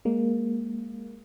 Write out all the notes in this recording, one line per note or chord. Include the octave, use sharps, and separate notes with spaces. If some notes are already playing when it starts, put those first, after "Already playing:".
G#3 A#3